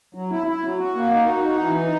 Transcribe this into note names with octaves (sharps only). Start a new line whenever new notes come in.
F#3
E4
E4
F#3
F#4
A#3
D#4
F#4
D#4
E3
D#4